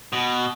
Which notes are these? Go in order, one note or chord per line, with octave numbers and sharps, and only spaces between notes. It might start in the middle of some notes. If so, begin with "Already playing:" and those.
B2